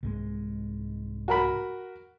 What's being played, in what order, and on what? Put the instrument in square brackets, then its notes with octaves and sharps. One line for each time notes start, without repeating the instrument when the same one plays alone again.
[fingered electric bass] C2 G#2 G#3
[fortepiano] F#4 A#4 B5